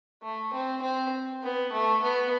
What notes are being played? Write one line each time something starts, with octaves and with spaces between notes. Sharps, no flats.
A3
C4
C4
B3
A3
B3